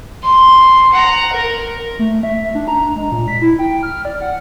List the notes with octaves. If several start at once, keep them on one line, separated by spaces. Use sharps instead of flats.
C6
F#5 A#5
A#4
A3
E5
D4
A#5
G#3
A#2
B6
E4
G5
F6
D5
F#5